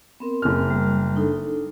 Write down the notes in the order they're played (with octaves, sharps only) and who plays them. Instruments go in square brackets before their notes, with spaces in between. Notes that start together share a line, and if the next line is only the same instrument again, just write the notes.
[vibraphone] B3 C4 A#4
[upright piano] F#1 F6
[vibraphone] G3
D4 D#4 A4